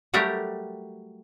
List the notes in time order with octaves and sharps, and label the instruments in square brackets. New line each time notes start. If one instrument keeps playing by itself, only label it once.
[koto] F#3 G3 A3 G4 A#4